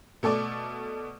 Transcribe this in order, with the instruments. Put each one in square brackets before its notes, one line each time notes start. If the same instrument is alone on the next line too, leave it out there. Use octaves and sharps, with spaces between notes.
[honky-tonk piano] B2 A3 A4 D5 D6